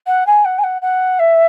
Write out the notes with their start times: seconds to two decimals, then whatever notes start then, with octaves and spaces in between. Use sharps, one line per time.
0.07 F#5
0.27 G#5
0.45 F#5
0.59 G#5
0.64 F#5
0.82 F#5
1.19 E5